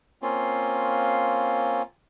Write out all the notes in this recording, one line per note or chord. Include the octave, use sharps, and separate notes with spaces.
A#3 C4 C#4 F4